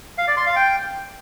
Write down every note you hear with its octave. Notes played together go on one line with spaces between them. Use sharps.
F5
D5
C6
F5
G5